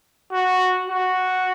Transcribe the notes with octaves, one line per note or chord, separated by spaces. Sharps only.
F#4
F#4